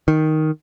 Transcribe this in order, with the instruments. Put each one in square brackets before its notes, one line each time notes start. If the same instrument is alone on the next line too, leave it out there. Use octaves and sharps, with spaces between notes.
[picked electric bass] D#3